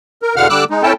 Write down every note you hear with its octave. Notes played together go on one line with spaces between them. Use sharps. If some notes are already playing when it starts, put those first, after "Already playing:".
A#4
E2 B2 D3 F5 F#5 F6
D3 G3 D6 E6 F#6
G#3 D#4
C4 C#4 E4 A4 G5 A5